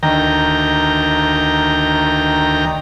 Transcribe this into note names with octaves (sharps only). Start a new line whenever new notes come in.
D2 D#3 G5 A#5